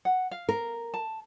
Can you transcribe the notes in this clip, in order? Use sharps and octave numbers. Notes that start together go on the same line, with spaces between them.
F#5
F5
A#4
A5